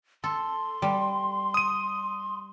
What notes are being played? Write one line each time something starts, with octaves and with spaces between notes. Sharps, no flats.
A4 C6
G3
D#6 D#7